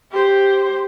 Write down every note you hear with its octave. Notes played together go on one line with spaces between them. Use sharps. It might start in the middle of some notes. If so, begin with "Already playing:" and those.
G4 C5